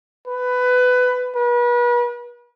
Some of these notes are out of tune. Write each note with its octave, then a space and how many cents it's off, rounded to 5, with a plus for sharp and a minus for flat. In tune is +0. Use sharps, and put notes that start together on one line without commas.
B4 +15
B4 -40